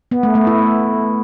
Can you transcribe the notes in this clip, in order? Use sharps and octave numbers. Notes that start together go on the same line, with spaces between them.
B3
A3
A3
E4